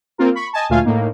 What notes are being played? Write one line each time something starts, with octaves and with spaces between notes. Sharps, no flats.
A#3 C4 F4 A#4
B5 C#6
D#5 G#5 A5
D2 A#2 A3 F4 F5 G#5
A2 A#3 D#4